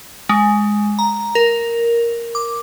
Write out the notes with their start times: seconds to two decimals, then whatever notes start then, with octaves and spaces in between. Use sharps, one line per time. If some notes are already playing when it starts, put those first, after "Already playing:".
0.29 G#3
0.99 A#5
1.35 A#4
2.35 D6